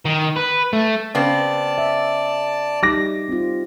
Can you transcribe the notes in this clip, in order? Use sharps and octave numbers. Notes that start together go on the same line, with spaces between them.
D#3
B4
A3
C#3 B3 C4 D5 A5
E5
G3 D#4 F#4 D6 A#6
C4 F4